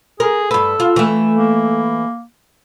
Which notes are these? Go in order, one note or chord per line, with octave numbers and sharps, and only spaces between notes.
G#4 A#4
G2 A4 B4
F4
E3 A3
A#3